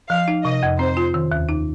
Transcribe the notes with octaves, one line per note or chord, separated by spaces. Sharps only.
F3 F5
D#4
C3 D#5
F2
C4 C5
F4
D#3
D#2
D#4